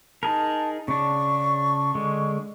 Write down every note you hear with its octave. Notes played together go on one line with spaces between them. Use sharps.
D#4 G#4 A#4 A5
C#3 D4 C#6
D3 G#3